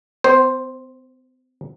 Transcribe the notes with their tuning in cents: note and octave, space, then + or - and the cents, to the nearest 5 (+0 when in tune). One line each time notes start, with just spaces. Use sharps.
C4 -45 C5 +0